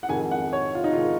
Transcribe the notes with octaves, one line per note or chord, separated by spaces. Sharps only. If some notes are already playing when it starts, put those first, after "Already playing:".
F#5
F2 D#3 G#3 G#5
F#5
C#5
F4
D#4
D#3 G#3 F4